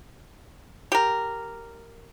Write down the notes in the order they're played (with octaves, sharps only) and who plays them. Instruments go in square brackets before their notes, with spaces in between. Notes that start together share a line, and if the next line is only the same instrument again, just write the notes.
[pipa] G4 A#4